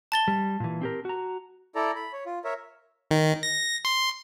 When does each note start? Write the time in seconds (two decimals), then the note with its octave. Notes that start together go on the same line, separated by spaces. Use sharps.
0.12 A5 A6 G7
0.28 G3
0.60 A#2 E3
0.81 C4 G4 A#4
1.05 F#4 A#5
1.75 E4 A4 D5 A#5
1.95 B5
2.13 C#5
2.26 F4
2.44 A#4 C#5 E5
3.11 D#3
3.43 A#6
3.85 C6